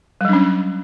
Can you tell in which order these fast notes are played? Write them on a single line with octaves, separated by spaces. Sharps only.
G3 F#3 D4 C#4